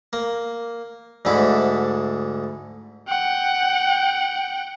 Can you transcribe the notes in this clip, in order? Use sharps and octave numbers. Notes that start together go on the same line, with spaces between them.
A#3
D2 G#2 D3 E4 D6
F#5 G5